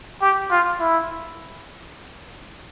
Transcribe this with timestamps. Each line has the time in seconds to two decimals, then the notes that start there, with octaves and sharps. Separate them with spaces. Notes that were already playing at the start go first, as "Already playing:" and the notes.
0.22 G4
0.51 F4
0.80 E4